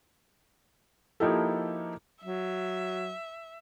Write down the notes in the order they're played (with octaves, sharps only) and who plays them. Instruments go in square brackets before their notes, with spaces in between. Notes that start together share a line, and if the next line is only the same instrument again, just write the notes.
[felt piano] F3 A#3 D#4 E4 G4 A4
[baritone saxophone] F#3 [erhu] E5